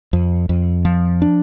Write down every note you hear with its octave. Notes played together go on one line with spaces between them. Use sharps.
F2
F2
F3
D4